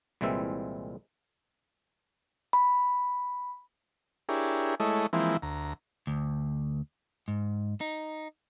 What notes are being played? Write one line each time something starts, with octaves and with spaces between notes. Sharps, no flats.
C2 A#2 E3 G#3 C4 E5
B5
D4 E4 G4 G#4 A#4 C#5
G#3 A3 E4 A4 C#5 D#5
E3 F3 G#3 A#3 C4 E4
D2 A#5
D2
G#2
D#4